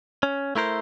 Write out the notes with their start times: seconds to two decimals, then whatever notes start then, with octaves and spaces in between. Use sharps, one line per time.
0.23 C#4
0.56 A3 E4 A#4 C5